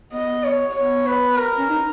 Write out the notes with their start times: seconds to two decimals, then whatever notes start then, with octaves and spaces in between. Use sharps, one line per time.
0.13 B3 D#5
0.44 C#5
0.75 B3 C#5
1.06 B4
1.38 A#4
1.58 C#4
1.70 D#4